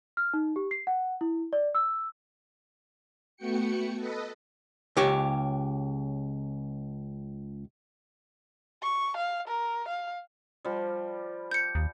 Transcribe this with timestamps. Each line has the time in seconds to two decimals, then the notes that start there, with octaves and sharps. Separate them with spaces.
0.17 F6
0.34 D#4
0.56 G4
0.71 C7
0.87 F#5
1.21 E4
1.53 D5
1.75 E6
3.36 A3 B3 F#4 G5 C#7
3.96 A4 B4 D#5
4.97 C#2 G4 C#5
8.82 C#6
9.16 F5
9.47 A#4
9.88 F5
10.65 F3 G3
11.51 G6 C#7
11.75 D#2